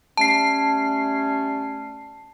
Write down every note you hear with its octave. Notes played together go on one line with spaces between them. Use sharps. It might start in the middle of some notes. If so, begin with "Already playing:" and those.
G3 A3 C#4 A5 C7